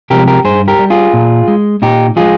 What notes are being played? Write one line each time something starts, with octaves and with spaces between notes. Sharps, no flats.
C3 F3 G#3 G4 A#4
G4 A#4
G2 G#4 C5
G4 A#4
G3
F4 G#4
A#2
G#3
A#2 D#4 G4
F3 G#3 F4 G#4